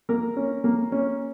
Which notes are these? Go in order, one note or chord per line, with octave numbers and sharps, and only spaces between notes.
A#3 A#4
C#4
A#3
C#4